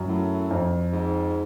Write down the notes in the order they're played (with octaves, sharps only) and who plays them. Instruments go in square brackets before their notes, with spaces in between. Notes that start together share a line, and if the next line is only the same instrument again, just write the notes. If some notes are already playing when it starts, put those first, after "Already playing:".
Already playing: [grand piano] F#2
[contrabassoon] A2
[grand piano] F2
[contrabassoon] G#2